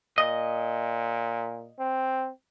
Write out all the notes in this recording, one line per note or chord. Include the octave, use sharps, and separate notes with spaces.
A#2 D#5
C4